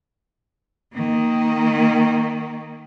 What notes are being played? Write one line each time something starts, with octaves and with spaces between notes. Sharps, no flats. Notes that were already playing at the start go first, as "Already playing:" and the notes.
D#3 A#3